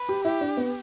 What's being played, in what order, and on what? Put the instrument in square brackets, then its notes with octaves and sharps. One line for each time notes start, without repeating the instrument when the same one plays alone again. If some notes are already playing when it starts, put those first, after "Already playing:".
Already playing: [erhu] B4
[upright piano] G4
[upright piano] E4 [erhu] G4
[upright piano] D4
B3